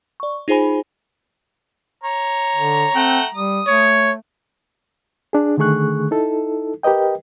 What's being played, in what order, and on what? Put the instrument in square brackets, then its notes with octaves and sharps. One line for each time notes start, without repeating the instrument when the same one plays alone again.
[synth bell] D5 C#6
D#4 F4 G#4 C5 G#5 B5
[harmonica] C#5 [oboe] A#5
[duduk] D3
[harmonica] A3 F#5 G5 [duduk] C4
[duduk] G3 [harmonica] D#6
[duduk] A3 [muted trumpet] C#5
[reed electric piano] D4 G#4
D3 D#3 A3 G#4 C#6 F#6
D#4 E4 A4
G4 A#4 B4 D#5 G5